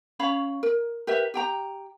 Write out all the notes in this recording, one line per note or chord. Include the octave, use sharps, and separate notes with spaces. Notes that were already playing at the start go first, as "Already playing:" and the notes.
C#4 C#5 F5 B5
A#4
G4 A#4 B4 E5
G4 G5 A#5